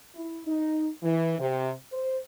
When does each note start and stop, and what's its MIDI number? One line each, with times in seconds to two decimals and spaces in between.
0.15 0.41 64
0.46 0.88 63
1.03 1.35 52
1.39 1.71 48
1.93 2.19 72